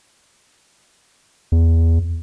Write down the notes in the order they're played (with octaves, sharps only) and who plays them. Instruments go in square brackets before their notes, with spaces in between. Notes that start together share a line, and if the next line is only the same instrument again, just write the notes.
[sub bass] E2